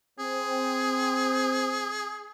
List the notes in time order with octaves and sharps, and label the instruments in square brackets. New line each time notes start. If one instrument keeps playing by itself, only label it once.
[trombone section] C4 [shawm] G#4